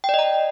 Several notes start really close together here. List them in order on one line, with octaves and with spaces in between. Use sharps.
G5 D5 D#5 A#5